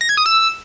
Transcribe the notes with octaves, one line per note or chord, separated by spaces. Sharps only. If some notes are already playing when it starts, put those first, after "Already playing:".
A#6
G#6
D#6
E6